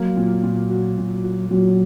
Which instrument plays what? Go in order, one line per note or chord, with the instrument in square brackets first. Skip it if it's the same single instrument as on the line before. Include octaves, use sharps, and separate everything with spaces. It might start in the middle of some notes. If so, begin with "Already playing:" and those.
Already playing: [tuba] F#3 [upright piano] A#3
[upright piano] A#2
A#2
F#4
A#2
F#4
[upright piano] A#2 [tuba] F#3